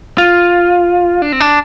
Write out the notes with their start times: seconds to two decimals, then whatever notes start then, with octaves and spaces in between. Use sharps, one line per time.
0.18 F4
1.22 D4
1.32 C4
1.40 D4